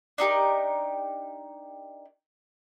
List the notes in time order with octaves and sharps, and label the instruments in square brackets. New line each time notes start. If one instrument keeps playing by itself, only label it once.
[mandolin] D4 D#4 G4 A#4